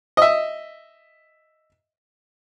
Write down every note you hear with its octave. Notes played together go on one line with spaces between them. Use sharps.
D#5 E5